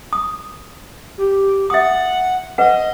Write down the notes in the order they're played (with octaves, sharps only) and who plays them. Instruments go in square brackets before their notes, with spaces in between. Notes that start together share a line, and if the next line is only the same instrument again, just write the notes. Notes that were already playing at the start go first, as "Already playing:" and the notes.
[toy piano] D#6
[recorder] G4
[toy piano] E5 D#6 [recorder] F#5
[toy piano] B4 F#5 [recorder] D#5